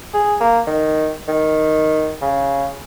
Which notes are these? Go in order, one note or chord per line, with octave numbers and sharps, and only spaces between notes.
G#4
A#3
D#3
D#3
C#3